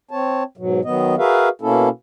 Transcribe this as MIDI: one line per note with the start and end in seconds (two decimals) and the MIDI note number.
0.11 0.43 60
0.11 0.43 73
0.11 0.43 81
0.57 0.81 44
0.57 0.81 47
0.57 0.81 54
0.85 1.15 51
0.85 1.15 54
0.85 1.15 59
0.85 1.15 75
1.18 1.49 66
1.18 1.49 68
1.18 1.49 70
1.18 1.49 71
1.18 1.49 76
1.18 1.49 77
1.61 1.89 47
1.61 1.89 58
1.61 1.89 61
1.61 1.89 64
1.61 1.89 69